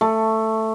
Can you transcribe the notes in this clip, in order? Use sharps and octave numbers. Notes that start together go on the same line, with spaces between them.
A3